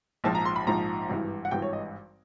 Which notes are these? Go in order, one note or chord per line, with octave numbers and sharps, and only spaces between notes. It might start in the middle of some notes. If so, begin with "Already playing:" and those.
A#1 G#2 F3 A5
A#5
C6
B5
A#1 G#2 F3 A#5
G#1 G2 E3
F#5
G#1 G2 E3 G5
C#5
D#5